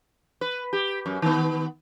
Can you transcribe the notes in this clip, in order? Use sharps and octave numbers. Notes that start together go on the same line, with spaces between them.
B4
G4
F#2
D#3 B3